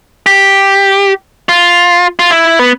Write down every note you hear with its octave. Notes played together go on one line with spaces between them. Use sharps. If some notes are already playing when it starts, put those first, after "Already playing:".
G4
F4
F4
E4
B3